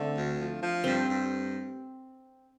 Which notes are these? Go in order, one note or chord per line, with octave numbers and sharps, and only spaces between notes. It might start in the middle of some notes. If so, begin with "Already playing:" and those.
Already playing: D3 A3 C4 D4
D2
F3
F3
G2 C4
G2